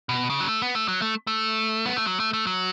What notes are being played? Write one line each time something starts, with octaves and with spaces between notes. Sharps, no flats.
B2
C#3
F#3
A3
B3
A3
F#3
A3
A3
B3
A3
F#3
A3
A3
F#3